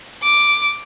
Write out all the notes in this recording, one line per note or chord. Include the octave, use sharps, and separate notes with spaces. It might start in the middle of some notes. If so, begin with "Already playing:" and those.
D6